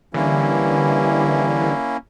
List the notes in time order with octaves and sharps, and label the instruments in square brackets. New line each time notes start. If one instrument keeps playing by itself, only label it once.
[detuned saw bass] D3 [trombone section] E3 G3 [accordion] A#3 C#4 E4